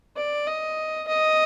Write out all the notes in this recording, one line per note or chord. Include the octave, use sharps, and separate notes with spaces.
D5
D#5
D#5